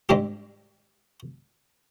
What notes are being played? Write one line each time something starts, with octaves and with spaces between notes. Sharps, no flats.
G#2 G3 G#3 C4 D4 G4